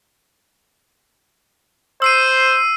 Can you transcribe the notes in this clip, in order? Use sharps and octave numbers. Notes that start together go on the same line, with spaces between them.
C5 E6 C7 D#7